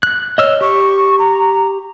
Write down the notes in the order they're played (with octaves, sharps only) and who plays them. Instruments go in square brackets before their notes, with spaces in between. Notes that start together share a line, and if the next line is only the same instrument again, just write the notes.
[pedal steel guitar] F#6
[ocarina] C#5 [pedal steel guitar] D#5 E6 F6
[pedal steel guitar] G4 [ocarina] C#6
[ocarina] A#5